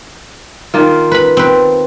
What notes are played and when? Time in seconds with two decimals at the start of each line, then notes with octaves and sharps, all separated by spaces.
0.74 D#3 A#3 F4
1.12 B4 B5
1.37 C4 B4